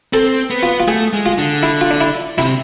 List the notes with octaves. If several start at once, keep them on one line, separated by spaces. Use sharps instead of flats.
C4 A4
B3
F4
F4
A3 G#4
G#3
F4
D3
E4
F4
D4
E4
C3 E4